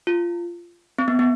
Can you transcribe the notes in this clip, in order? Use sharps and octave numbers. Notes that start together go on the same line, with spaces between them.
F4
C4
B3
B3